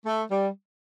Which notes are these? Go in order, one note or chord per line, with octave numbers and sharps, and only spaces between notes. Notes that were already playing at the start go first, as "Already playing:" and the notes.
A3
G3